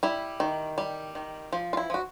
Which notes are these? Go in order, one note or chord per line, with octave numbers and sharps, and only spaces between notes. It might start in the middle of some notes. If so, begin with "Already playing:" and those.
G3 E4
D#3
G3
D#3
F3
F4
E4
F3
F#4